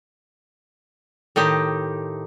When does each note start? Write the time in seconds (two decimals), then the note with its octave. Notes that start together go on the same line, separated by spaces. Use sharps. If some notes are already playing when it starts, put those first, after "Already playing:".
1.36 A2 D#3 D#4 G4